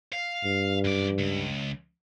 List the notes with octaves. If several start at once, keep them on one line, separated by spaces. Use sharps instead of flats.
F5
G2
F#2 D5
C#2